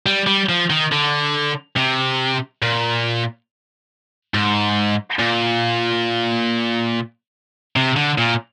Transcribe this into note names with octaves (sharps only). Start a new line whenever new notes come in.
G3
G3
F3
D#3
D3
C3
A#2
G#2
A#2
C3
D3
A#2